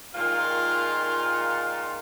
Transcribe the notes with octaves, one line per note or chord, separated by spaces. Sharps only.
A#2 D#3 G#3 F4